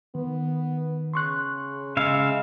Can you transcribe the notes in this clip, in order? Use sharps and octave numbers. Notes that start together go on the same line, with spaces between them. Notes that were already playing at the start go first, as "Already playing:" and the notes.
D#3 B3
C#3 C6 C#6 F#6
C#3 G#3 E5 F5